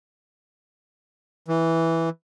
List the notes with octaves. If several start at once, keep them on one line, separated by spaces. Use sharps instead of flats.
E3